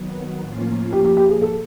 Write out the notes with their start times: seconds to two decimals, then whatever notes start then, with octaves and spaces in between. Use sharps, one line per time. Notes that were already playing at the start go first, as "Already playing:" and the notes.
Already playing: D#3 F#3 B3
0.42 A2 F3 A#3 C#4 F4
0.92 A#2 F3 A#3 G4
1.05 G4
1.17 G4
1.29 G#4
1.42 A4